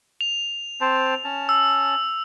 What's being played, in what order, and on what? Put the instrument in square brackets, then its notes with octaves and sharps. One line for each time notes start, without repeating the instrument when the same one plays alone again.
[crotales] F7
[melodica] C4 C5 A5
C#4 A5
[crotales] E6